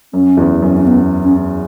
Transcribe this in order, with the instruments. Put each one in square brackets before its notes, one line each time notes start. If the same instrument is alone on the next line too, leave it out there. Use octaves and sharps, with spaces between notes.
[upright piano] F#2 [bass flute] C#4
[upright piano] E2
F#2
[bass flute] C#4
B3
C#4